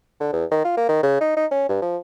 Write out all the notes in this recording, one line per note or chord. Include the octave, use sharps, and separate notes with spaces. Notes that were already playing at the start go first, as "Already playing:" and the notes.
D3
E2
D#3
F4
A#3
D#3
C#3
D#4
D#4
C#4
G2
F3